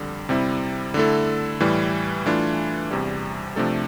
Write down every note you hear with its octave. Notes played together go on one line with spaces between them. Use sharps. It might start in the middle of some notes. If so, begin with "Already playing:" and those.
Already playing: F2 D3 G3
C3 G3 C4 E4
D3 A3 E4 A4
A2 E3 G3
E3 A3 D4 F4
E2 C3 G3
C3 F3 A3 D4 A4